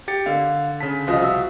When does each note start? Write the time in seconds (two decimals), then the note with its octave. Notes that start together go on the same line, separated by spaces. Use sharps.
0.08 G4 A6 C#7
0.26 D3 A#4 D5 D#5 F5
0.80 C#3 A5 B6
1.07 C2 F3 F4 F#4 D#5
1.22 F#4 E5 E6